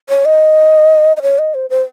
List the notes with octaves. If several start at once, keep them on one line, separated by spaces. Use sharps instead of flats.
C#5
D#5
D#5
C#5
D#5
C5
C5